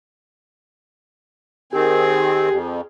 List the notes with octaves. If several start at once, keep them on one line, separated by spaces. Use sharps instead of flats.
D#3 C4 G4 G#4
F2